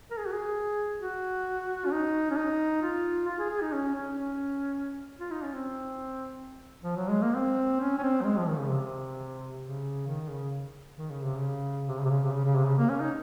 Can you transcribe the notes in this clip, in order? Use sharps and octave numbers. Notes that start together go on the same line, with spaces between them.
A#4
G#4
F#4
G#4
F#4
C#4
D#4
C#4
D#4
F4
F4
G#4
G#4
D#4
C#4
C#4
C#4
F4
D#4
C#4
C4
F3
F#3
G#3
A#3
C4
C#4
C#4
C4
F#3
G#3
F3
D#3
C#3
C3
C#3
D#3
C#3
D#3
C#3
C3
C#3
C3
C#3
C3
C#3
C3
C#3
C#3
C3
C#3
A#3
C#4
D#4